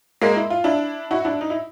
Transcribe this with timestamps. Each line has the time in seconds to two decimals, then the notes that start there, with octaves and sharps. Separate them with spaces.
0.22 G#3 A#3
0.36 E4
0.50 F4
0.64 D4 E4
1.11 E4 F#4
1.25 D4 E4
1.41 D#4
1.50 E4